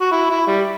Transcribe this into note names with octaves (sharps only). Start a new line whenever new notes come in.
F#4
E4
E4
G3